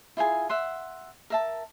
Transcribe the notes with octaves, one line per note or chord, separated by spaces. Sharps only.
E4 F4 G#4 G#5
E5 F#5 C6
A#4 E5 A5